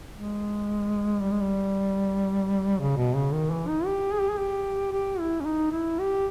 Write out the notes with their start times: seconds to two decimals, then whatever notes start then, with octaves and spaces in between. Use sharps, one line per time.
0.14 G#3
1.20 G3
1.31 G#3
1.40 G3
2.79 C#3
2.97 B2
3.16 C#3
3.33 D#3
3.51 E3
3.68 D#4
3.86 G4
4.13 G#4
4.21 G4
4.31 G#4
4.39 G4
4.92 G4
5.19 E4
5.41 C#4
5.45 D#4
5.72 E4
5.99 G4